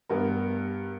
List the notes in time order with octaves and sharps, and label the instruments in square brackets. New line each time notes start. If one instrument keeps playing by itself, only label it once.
[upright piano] G2 B3 A#4